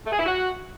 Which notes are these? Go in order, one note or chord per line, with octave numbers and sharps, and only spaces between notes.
A3
G#4
E4
F#4